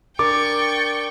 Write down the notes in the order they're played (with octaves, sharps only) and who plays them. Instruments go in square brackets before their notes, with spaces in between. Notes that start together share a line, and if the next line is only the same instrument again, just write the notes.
[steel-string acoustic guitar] D4 A#4 [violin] G5 C#6 [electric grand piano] D6 [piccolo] A6